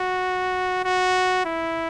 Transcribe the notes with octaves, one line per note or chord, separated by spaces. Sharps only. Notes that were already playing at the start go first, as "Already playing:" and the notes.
Already playing: F#4
F#4
E4